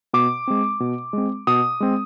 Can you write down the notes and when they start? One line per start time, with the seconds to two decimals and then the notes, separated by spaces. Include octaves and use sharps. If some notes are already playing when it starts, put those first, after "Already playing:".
0.13 B2 D6
0.47 G#3 C4
0.80 B2
1.13 G#3 C4
1.47 B2 D#6
1.80 G#3 C4